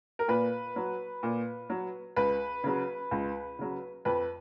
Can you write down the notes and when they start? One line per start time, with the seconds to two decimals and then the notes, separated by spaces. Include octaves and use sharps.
0.19 A#4
0.28 A#2 B4
0.76 F#3
1.23 A#2
1.70 F#3
2.16 C#2 B4
2.64 C#3 F#3
3.11 C#2
3.59 C#3 F#3
4.05 F2 B4